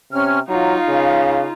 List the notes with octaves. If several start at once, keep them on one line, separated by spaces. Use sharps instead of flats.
C3 C#4 F6
F#3 D#4 F4 F5
C#3